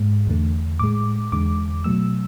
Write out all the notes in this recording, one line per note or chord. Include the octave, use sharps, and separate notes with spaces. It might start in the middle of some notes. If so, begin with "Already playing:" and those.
Already playing: G#2 G#3
E2 D3 A3
A2 G#3 D6
E2 D3 G#3 D6
B2 F#3 A3 E6